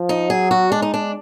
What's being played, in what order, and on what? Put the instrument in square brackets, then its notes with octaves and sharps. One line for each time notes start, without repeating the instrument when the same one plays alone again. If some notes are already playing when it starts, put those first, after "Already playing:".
Already playing: [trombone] F3
[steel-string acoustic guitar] D#4
[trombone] F#3 [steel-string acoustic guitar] G#4
[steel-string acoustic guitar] F#4
[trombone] G#3 [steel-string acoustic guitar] D4
[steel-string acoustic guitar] D#4
D4